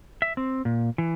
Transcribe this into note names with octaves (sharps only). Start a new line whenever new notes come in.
E5
C4
A#2
E3